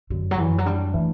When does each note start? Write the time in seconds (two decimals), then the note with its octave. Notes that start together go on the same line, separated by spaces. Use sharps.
0.10 F#2 D3
0.31 F#3
0.38 F#2 E3
0.58 F#3
0.66 G3 D4
0.94 E3 A3